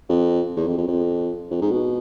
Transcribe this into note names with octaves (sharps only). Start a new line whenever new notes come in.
F2
E2
F2
F2
F2
F2
G#2
B2